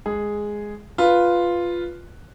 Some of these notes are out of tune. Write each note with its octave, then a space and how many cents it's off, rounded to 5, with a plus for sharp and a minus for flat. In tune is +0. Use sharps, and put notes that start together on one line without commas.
G#3 +0 G#4 +0
F4 +0 B4 +0